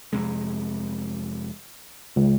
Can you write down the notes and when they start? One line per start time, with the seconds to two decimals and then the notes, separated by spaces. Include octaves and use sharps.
0.13 F2 C3 G#3
2.16 C#2